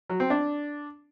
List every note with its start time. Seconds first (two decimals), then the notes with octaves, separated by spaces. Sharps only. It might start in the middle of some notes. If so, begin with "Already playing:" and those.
0.10 F#3
0.20 C4
0.30 D4